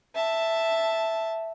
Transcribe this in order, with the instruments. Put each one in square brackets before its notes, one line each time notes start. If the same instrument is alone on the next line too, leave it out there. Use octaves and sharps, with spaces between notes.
[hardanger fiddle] E5 A5